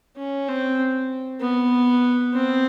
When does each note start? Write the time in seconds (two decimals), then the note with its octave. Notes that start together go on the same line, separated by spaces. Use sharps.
0.17 C#4
0.48 C4
1.41 B3
2.33 C4